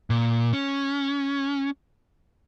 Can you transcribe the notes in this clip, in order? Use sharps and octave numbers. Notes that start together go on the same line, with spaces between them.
A#2
C#4